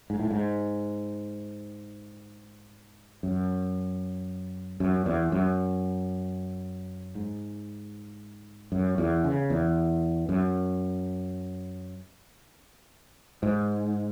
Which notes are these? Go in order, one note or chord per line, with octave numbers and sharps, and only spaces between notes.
G#2
A2
G#2
F#2
F#2
E2
F#2
G#2
F#2
E2
C#3
E2
F#2
G#2